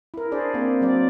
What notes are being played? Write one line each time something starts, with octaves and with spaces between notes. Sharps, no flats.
E4 A#4
D4 G#4 C5 D5
A#3 C4
F#3 C4 D5